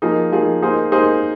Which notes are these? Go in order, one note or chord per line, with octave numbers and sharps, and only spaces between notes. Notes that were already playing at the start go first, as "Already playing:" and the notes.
F3 A#3 D#4 G#4
F3 A#3 D#4 G#4
A#3 D#4 G#4 C5
A#3 D#4 G#4 C5